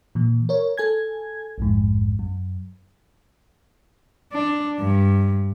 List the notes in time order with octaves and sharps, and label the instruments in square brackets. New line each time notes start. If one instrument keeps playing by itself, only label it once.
[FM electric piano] A#2 E3
A#4 C#5
A4 G#5 G#6
A#1 F2 G#2
F#2
[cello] D4
G2